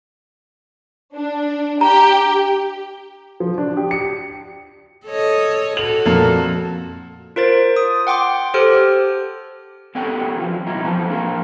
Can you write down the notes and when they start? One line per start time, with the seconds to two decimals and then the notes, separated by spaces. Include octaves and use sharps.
1.14 D4
1.81 G4 A#5
3.40 F3
3.58 D4
3.77 G4
3.91 C#7
5.07 A4 C#5 D#5
5.77 F#4 A4 F#7
6.06 F2 A#2
7.36 F4 A#4 C5 A6
7.76 D#6
8.07 F#5 G5 C6 D6
8.54 G4 A4 C5 F6
9.95 B3 C#4 G4 A4 D5 G5
10.36 E2 F3 F#3
10.67 B2 F#3 G3 E4 D#5 A#5
10.84 F2 E3 F3 B3 A5
11.09 A#3 D4 G#4 A#4